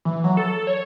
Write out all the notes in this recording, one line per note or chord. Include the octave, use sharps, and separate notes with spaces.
E3
F#3
A4
C#5